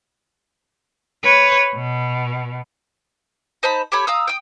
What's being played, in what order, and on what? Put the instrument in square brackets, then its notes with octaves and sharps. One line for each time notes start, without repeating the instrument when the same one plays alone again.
[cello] B4 C#5
B2
[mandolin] D#4 C5 A5 B5
G4 A4 C#5 B5
F5 A#5 D#6 E6
G5 D#6